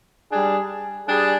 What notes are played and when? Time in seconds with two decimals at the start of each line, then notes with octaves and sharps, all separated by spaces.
0.30 G3 D4 G#4
1.08 G3 D4 G#4